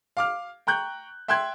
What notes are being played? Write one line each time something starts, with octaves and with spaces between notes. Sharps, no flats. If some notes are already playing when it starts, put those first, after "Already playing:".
F5 D6 F6
G5 A#5 C#6 F#6 G6
E5 G5 C6 E6 F#6 G#6